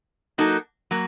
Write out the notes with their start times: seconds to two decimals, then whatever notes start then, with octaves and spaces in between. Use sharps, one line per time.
0.38 F#3 A#3 D#4 F#4 A4
0.91 F#3 A#3